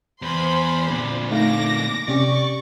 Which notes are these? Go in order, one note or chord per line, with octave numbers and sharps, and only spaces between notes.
E2 C5 B5 C6
A#2 D3
A3 D#4 F5 D6 A#6
C3 C#4 G4 D5 C#6